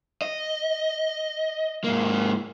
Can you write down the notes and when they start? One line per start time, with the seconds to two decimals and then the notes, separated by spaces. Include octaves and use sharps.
0.22 D#5
1.84 G#2 A#3